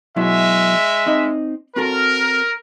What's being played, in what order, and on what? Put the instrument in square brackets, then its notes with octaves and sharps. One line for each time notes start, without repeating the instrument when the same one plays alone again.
[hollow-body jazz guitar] B2 F#3 E4 [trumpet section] G#3 E5
[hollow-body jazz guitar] C4 D#4 D#5
[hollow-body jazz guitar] C4 F#4 A4 [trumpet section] A#4